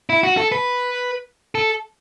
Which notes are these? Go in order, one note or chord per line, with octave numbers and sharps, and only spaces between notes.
E4
F#4
A4
B4
A4